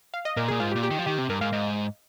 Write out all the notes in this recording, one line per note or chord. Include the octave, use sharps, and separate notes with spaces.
F5
D#5
A#2 A#4
A#2 G#4
G#2 F4
G4
A#2
G4
D#3
F3
D#3 G4
C3
G2 A#4
G#2 F5
G#2 D#5